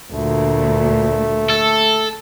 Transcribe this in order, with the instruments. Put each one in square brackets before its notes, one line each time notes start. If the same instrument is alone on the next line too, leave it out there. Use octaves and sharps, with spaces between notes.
[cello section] D2 A#2 [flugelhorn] A3
[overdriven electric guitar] A4